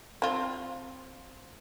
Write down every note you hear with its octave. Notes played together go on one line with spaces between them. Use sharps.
C4 F4